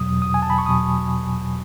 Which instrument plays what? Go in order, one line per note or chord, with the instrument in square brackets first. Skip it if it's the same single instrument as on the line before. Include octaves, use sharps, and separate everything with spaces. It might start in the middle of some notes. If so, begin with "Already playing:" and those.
Already playing: [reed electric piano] E2 B2 F#3 D#6
D#6
G#5
A5
B5
C#6
E2 B2 F#3 D#6